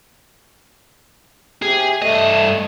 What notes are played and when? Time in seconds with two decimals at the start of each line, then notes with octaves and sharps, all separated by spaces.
1.62 C3 G4 G#4
2.02 G2 A3 D#5